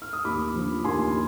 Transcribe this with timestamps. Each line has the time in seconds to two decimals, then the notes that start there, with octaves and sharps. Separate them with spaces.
0.02 F6
0.13 D#6
0.25 D#2 B5 D6
0.54 D3 F3
0.84 D#2 G#5 C6